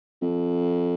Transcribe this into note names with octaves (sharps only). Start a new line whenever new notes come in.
F2